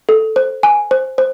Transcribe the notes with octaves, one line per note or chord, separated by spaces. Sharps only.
A4
C5
G#5
C5
C5